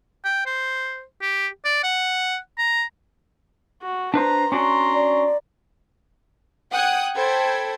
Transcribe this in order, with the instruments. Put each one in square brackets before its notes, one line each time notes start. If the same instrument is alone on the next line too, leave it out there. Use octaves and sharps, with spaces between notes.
[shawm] G5
C5
G4
D5
F#5
A#5
[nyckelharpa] F#4
[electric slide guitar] D4 B4 C5 [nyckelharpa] A#5
[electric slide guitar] C#4 D4 F#4 [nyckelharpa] A#5 C6
[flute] D5
[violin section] F#5 G5 D#6 F#6 G#6
A4 C5 G5 B5 G#6